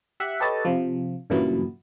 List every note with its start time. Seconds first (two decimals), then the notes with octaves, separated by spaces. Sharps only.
0.20 G4 E5 F#5
0.40 G4 A4 B4 C#5 D#5 A5
0.65 C3 F3
1.30 G2 A#2 C#3 E3 F#3 B3